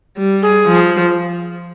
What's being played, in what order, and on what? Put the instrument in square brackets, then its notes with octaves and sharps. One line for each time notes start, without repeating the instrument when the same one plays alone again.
[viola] G3
[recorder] G#4
[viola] F3